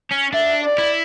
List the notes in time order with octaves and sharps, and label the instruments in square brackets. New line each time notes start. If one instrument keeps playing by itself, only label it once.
[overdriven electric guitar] C#4
[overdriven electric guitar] D4 [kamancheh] E5
[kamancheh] D5
[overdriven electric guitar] E4